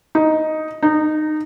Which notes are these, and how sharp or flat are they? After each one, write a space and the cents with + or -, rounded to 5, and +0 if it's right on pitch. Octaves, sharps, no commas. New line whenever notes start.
D#4 +5
D#4 -20